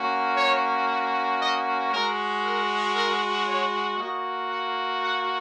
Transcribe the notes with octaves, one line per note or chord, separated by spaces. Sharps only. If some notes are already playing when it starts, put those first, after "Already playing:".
Already playing: A#3 C#4 F#4
C#5
D#5
G#3 F#4 A#4
A#4
A#4
C#5
A#3 F#4 D#5
F#5
F#5